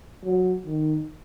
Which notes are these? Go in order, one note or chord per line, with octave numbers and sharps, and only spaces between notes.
F#3
D#3